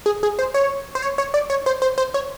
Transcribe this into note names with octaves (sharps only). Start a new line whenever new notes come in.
G#4
G#4
C5
C#5
C5
C#5
C#5
D5
C#5
C5
C5
C5
C#5